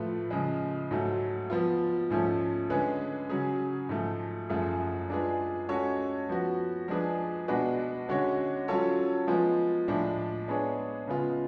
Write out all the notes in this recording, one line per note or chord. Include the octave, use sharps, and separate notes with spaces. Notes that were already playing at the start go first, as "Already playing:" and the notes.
Already playing: A2 F3 A3 F4 B4
C#3 F3 G#3
G#2 F#3 A3
F3 B3 F4
G#2 F3 A3 C#4
D3 G#3 C#4 G#4 B4
C#3 F#3 C#4 G#4
G#2 F3 A3
F#2 F3 A3 F4 G#4
G#3 D4 F4 G#4 B4
G#3 C#4 F#4 A4 C#5
F3 B3 F#4
F3 G#3 D4 G#4 B4
B2 G#3 D4 F#4 B4
D3 G#3 C#4 F#4 C#5
F#3 C#4 F4 A4 C#5
F3 G#3 B3 F4
A2 F3 G#3 D4
G#3 B3 D4 G#4 C#5
C#3 G#3 B3 F4